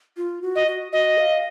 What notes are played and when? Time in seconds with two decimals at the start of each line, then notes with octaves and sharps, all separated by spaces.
0.17 F4
0.42 F#4
0.56 D#5
0.67 F#4
0.92 F#4 D#5
1.18 F5